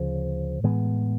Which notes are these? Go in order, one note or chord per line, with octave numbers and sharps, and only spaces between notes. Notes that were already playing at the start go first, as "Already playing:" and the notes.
Already playing: D2 C#3 F3
A2 E3 G#3 B3